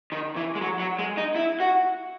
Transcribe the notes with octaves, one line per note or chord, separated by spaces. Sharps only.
D#3
E3
G#3
F#3
F#3
G#3
D#4
E4
F#4